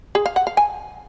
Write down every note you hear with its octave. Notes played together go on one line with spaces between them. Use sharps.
G#4
F5
F#5
F5
G#5